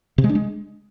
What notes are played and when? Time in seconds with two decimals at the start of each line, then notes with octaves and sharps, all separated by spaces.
0.18 C3
0.24 G#3
0.29 D4
0.35 G#3